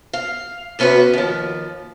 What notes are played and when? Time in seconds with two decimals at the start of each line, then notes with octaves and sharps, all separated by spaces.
0.13 F5
0.79 C3 B3 C#4 F#4 B4
1.13 D#2 F3